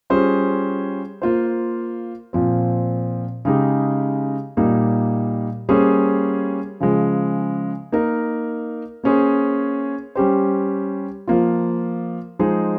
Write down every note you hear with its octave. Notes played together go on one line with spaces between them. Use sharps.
G3 C#4 F4 G#4 C5
A#3 F4 C5
A#2 F3 C4
C#3 G#3 D#4 G4
A#2 G3 A#3 D#4
G3 A#3 C#4 G#4 C5
C#3 F3 G#3
A#3 D#4 A#4
A#3 C#4 G#4 C5
G3 C#4 G4 C5
F3 A#3 F4
F3 G#3 D#4 G#4 C5